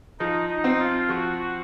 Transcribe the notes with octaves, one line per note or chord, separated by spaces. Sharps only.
F3 D#4
D#4
C4
F4
F3 F#4